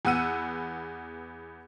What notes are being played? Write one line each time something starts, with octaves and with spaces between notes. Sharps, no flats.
E2 B3 F#5 E6 D#7